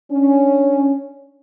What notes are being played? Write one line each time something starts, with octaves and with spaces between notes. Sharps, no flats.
C#4 D4